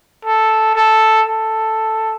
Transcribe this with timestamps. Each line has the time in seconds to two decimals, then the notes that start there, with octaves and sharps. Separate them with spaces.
0.25 A4
0.75 A4
1.27 A4